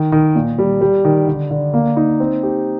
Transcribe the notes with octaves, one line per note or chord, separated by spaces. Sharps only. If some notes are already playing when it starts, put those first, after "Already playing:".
Already playing: D#3
D#3
A#2
G3
G3
D#3
D3
D3
A#3
D#4
C4
G4